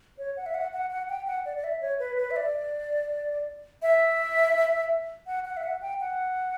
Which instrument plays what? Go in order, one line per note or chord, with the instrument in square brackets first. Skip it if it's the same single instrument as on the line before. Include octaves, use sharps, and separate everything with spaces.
[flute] C#5
F#5
E5
F#5
F#5
F#5
G5
F#5
D5
D5
E5
C#5
B4
B4
E5
D5
E5
F#5
F#5
E5
F#5
G5
F#5